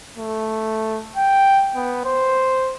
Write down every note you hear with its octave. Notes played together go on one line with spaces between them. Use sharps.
A3
G5
B3
C5